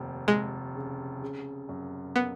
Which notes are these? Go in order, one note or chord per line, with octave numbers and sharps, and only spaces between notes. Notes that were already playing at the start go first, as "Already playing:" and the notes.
Already playing: F1 D#2
F1 G#3
C#3
C#3
F#2
A#3 B3